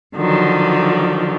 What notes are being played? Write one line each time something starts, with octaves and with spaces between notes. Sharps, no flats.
D3 D#3 F3 F#3